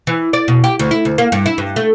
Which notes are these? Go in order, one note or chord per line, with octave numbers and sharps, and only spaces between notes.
E3
D5
B2
G4
D2
E4
D2
A#3
G2
E4
G2
A3